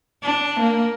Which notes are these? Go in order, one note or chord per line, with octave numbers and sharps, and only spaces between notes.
D4
A#3